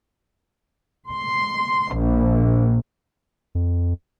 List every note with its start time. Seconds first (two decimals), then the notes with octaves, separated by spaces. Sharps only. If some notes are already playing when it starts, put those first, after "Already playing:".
1.11 C6
1.96 A#1
3.55 F2